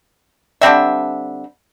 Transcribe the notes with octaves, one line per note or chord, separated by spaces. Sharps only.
D3 G3 C4 E5